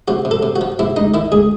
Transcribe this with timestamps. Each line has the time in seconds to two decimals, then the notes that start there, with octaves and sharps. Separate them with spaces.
0.08 C3 F#4
0.25 C3
0.31 A4
0.43 C3
0.56 F#4
0.61 F3
0.79 C3 E4
0.96 C#2 D#4
1.14 D#3 E4
1.32 C#2 G#4